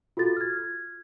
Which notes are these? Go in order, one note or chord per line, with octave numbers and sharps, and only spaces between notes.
F4 F#4 A4 A6
F6 G#6